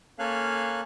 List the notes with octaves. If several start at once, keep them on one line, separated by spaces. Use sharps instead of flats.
A#3 C#4 A4 F5 G#5 F#6